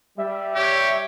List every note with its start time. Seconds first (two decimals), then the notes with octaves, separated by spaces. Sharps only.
0.18 G3 E5
0.55 G4 C#5